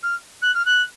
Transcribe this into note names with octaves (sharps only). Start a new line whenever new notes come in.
F6
F#6
F6
F#6